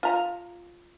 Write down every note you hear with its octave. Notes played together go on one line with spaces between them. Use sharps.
F4 A#5